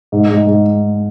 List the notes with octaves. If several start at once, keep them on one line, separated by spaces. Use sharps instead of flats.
G#2
G#2
G#2